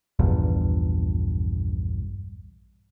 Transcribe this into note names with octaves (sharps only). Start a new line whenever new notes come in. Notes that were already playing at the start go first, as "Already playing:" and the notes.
A#1 E2 G2 A#2